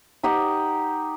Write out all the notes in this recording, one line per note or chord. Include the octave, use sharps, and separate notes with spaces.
D#4 G4 D#5 F#5